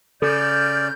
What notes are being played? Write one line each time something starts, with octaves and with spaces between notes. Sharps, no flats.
C#3 A4 D5 F6 G6